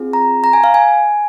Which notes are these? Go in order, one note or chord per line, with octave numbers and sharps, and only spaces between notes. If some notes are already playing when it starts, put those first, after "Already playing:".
Already playing: C4 F4 G#4
A#5
A#5
G#5
F5
G#5